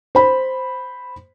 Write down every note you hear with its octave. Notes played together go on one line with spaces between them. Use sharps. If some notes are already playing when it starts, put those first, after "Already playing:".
C5 B5